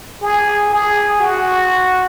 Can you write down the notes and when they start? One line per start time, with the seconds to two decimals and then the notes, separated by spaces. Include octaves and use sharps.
0.22 G#4
0.70 G#4
1.20 F#4